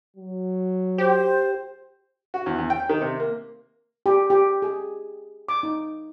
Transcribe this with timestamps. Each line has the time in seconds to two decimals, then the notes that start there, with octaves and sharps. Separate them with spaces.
0.17 F#3
0.98 G4 C5
2.34 F#4
2.46 E2
2.58 E2
2.70 G5
2.89 D#3
3.01 C3
3.20 A#3
4.06 G4
4.30 G4
4.62 G#4
5.49 D6
5.63 D#4